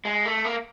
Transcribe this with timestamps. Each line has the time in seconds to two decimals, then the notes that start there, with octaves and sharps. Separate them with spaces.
0.05 G#3
0.25 A3
0.45 A#3